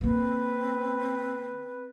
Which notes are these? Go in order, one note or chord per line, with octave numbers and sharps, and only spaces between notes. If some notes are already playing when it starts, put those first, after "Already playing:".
D3 A#3 C4 B4